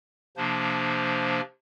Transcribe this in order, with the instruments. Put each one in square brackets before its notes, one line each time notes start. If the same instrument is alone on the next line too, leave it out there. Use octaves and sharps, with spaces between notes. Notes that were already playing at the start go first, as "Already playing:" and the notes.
[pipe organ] C3 F3 A#3 D4 C5